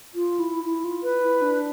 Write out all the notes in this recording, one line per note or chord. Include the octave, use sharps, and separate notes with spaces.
F4
E4
E4
F4
B4
E4
D4